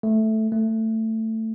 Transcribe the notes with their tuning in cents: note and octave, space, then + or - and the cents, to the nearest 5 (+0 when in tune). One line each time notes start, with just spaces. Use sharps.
A3 -5
A3 +15